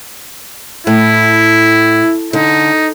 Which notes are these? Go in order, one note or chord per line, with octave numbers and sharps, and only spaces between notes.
A2 E4
D3 D#4